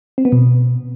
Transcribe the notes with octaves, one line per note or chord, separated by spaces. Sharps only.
C4
B3
B2